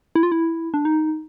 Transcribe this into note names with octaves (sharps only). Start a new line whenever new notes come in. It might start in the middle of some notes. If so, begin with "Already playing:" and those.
E4
F4
E4
D4
D#4